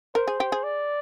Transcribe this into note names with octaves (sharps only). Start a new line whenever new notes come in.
A#4 C5
G#4
G4
G#4
D5